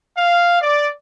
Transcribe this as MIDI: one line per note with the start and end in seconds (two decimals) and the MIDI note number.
0.16 0.57 77
0.61 0.88 74